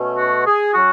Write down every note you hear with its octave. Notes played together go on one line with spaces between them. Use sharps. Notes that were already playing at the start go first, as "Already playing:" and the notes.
Already playing: B2 A3 C#4
F#4
G#4
F#3 C#4 F#4